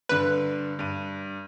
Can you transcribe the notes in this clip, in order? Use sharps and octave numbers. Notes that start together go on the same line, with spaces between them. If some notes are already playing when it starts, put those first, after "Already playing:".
G2 D3 B4
G2 D#7